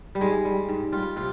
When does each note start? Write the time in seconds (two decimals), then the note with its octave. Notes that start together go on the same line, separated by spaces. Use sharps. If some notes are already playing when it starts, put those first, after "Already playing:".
0.15 G3
0.21 G#2 G#3
0.45 G3
0.69 G#2
0.92 G3 F4
1.16 C3 F4